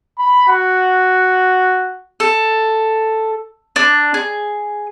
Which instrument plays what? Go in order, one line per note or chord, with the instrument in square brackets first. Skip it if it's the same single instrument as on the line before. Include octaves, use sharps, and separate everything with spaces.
[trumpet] B5
F#4
[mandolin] A4
D4
G#4